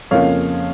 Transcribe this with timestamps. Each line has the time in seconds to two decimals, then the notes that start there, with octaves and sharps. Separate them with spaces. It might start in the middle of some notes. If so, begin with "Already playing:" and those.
0.11 F2 C#3 F3 A#3 C#5 F5